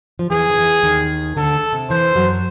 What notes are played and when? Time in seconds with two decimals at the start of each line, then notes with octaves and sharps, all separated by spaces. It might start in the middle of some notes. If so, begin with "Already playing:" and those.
0.19 F3
0.30 E2 E3 G#4
0.50 D#3
0.57 E2 E3
0.83 D#2 D#3
1.37 D2 D3 A4
1.72 C3
1.90 E2 E3 C5
2.16 F#2 F#3